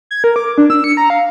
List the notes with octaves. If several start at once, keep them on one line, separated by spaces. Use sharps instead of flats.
G#6
A#4
D6
D4
E6
C#7
A#5
F5